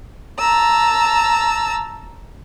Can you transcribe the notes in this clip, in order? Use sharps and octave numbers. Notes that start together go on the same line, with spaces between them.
A5 A#5 E6